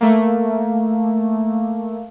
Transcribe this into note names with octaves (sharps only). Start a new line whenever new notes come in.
A3 A#3